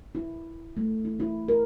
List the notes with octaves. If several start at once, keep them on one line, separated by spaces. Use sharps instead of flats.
E4
A3
E4
E4
A#4